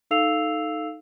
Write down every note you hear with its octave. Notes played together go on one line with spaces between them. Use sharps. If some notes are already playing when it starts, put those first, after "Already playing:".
D#4 A4 F5 E6 C7 F7